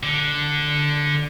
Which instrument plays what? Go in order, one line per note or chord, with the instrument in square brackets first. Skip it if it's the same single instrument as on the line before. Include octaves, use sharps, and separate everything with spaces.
[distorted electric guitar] D3